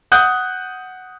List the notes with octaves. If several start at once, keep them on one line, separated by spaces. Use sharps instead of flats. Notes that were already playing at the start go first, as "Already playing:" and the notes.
F#5 D#6 F#6 G6